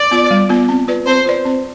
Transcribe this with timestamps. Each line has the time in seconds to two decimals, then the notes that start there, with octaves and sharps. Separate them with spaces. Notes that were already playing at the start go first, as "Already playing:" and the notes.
Already playing: D5
0.11 B3 F4
0.31 G3
0.49 B3 F4
0.69 C4
0.88 F4 B4 D5
1.06 C4 C5
1.26 F4 B4 D5
1.45 C4